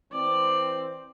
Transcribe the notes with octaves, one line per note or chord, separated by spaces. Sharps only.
E3 C4 D5